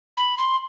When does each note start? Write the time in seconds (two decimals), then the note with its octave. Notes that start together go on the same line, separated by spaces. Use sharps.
0.17 B5
0.38 C6